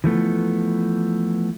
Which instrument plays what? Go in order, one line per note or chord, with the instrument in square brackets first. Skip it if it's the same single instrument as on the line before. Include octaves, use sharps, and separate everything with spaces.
[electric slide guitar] E3 F3 A3 B3